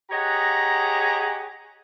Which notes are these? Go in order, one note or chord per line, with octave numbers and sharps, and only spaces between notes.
G4 G#4 C#5 D#5 F#5 A#5